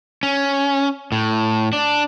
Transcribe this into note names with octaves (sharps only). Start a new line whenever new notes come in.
C#4
A2
D4